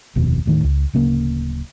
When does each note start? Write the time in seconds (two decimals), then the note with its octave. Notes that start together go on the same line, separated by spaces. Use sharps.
0.15 F1 D#2 B2
0.45 D#1 A2 D#3
0.64 C#2
0.93 D1 C#3 A#3